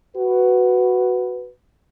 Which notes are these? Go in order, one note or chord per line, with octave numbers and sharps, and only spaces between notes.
F#4 B4